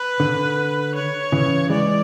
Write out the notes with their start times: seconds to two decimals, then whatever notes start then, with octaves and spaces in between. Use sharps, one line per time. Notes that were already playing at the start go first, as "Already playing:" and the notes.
Already playing: B4
0.20 D3
0.95 C#5
1.32 C#3 E3
1.70 E3 G#3 D5